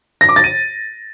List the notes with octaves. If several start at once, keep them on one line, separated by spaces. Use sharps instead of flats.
A#6
D6
A6
D#7